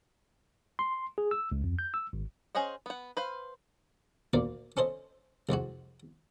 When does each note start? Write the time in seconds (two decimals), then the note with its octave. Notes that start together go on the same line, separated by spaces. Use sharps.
0.79 C6
1.18 G#4
1.31 E6
1.52 C#2
1.64 F2
1.79 G6
1.94 E6
2.13 G#1
2.55 C#4 G#4 C5 D#5 F#5
2.86 B3 F#5
3.17 B4 C5 F5
4.33 D2 A#2 A#3 D5
4.77 C#4 A4 C5 D#5
5.49 C2 F2 G#3 F#4